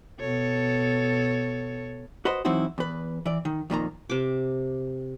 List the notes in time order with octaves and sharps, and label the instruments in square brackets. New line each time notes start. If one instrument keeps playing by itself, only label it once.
[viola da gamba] B2 A4 C#5
[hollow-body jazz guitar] F#4 B4 C5 D#5
E3 F#3 C4 D#4 E4 F#4
E2 B4
E3 D5
D#3
F2 A#2 D#3 A#5
[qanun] C3 D6